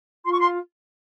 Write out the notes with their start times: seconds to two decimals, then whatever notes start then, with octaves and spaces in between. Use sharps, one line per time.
0.25 F4 C6
0.32 C#6
0.40 C6